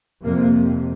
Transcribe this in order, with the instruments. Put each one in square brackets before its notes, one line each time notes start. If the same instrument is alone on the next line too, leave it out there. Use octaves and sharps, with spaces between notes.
[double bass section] F2 C3 A#3